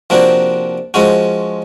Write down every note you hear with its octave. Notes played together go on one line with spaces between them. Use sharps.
C3 F3 A#3 D4 F#4
F3 G#3 C#4 F#4